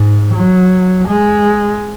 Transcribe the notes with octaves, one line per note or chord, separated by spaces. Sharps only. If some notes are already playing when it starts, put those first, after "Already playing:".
Already playing: G#2
F#3
G#3